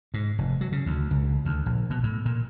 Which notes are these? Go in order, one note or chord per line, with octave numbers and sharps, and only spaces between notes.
G#2
F1
F#3
C#3
D2
C#2
D2
A#1
B2
A2
A#2